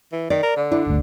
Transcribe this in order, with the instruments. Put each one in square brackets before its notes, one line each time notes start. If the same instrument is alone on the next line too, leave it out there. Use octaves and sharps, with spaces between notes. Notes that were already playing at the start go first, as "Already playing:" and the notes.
[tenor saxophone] E3
[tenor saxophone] D#3 [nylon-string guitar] D5
[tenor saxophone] A#4
D3
[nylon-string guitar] D4 [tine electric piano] E4
[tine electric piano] G1 D2